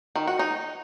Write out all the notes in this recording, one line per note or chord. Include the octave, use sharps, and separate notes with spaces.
D#3
F#4
D#4